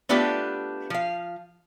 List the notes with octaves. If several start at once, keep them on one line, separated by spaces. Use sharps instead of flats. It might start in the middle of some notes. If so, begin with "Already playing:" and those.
A3 B3 D4 F4 G4 B4
F3 F5